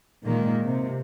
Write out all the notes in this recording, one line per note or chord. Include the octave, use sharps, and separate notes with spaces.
A#2 D#3 G#3 A#3
C3